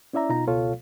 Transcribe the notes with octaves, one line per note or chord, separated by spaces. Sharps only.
C#4 E4 D5 E5 A#5
B2 D#4 F4 A#5
C#2 B2 F4 A4 C#5 F5